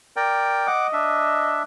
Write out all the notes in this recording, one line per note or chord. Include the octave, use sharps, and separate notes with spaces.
A#4 D5 G5
D#5 F#5 D6
D4 E5